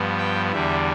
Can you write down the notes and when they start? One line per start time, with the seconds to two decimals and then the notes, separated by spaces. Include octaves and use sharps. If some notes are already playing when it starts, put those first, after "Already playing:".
Already playing: G2 F3 B3
0.18 G5
0.52 E2 D3 G3 E5